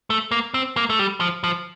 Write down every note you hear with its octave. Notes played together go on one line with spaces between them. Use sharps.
A3
A#3
C4
A#3
A3
G3
F3
F3